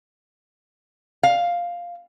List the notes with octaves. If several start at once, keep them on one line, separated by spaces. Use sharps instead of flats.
F5